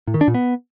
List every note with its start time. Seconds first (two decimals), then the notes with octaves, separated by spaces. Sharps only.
0.07 A2
0.14 D#3
0.21 D4
0.28 A#2
0.34 B3